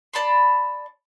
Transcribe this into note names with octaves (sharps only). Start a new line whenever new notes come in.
D5 A5 B5 C6